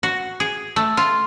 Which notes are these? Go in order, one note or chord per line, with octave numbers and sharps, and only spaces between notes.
F#4
G#4
A3
F4